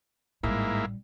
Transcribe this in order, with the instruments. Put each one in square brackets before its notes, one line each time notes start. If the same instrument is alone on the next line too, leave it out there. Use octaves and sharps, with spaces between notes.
[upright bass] A1 G3 [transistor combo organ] G#2 A#3 E4